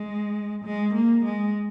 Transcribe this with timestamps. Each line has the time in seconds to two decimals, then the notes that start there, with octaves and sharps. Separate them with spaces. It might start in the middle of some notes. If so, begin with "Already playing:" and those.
Already playing: G#3
0.65 G#3
0.94 A#3
1.25 G#3